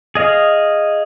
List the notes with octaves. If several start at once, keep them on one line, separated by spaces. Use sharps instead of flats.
G#4 D#5 F5